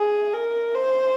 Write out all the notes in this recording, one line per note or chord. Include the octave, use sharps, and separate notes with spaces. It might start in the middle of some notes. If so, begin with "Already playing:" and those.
Already playing: G#4
A#4
C5